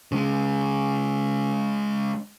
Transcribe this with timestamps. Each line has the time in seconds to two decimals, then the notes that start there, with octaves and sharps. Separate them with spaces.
0.12 C#3 G#3